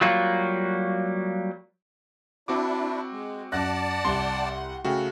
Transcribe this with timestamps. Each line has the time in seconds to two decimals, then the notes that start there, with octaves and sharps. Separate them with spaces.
0.01 F#3 G3 A#3 F4 F#4
2.48 C4 D4 E4 F#4 D6
3.12 G#3
3.52 F#2 D5 F#5 A5 F#6 A#6
4.05 C2 C6
4.85 C#3 A3 F#4 G5